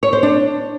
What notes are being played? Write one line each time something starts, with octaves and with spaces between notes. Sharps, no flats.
C#5
C5
D4